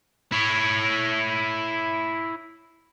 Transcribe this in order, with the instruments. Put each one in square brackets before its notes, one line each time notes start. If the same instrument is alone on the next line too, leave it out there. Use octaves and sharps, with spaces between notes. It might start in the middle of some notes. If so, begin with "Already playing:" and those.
[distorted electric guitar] E4 C#5